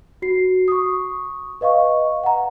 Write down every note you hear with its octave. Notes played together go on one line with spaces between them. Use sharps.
F#4 C7
C#6 D#6
B4 D#5 F5 C#6
F#5 A#5